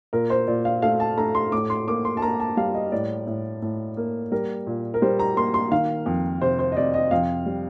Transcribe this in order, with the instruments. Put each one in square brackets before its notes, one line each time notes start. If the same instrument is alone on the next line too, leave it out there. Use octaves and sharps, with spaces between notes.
[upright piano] A#2 A#4
C5
A#2 D5
F5
A3 F5
A5
A3 A#5
C6
A2 D6
C6
A#3 D6
C6
A5
A#3 A#5
A5
G3 F5
D#5
A2 D5
A2
A2
A#3
G3 A#4
A#2
A#4
G3 C5
A#5
A#3 C6
C6
D#3 F5
F2
C3 C5
C5
D#5
C3 D5
D#5
F2 F5
G3